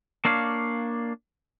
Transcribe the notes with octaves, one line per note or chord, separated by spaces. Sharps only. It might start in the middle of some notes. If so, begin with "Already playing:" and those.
A#3 D4 C#5 F5